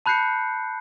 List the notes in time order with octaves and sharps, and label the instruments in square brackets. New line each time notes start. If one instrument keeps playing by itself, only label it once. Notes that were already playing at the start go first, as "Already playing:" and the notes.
[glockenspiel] A5 B5 F#6 G6 C7 C#7